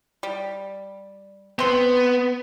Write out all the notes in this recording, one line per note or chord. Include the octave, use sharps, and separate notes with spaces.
G3
B3 C4 C6